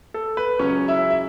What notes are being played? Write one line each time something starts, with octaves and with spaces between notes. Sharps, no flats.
A4
B4
C#2 C#3 F#3 C#4 C#5
E4 E5
E5